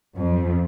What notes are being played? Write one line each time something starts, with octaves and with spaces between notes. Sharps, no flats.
F2